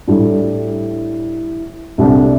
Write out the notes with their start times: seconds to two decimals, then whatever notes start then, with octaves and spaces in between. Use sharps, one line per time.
0.07 A2 G3 D4 A4
1.98 C2 C3 A3 D4